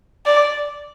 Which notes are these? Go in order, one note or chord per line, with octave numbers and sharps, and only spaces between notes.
D5